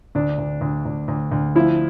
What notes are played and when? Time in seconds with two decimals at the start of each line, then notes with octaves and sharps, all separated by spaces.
0.15 D2 D4
0.38 D2
0.61 D2
0.85 D2
1.08 D2
1.32 D2
1.55 F3 E4